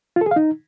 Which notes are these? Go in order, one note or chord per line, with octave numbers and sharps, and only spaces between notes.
F4
A4
G#4
F5
D#4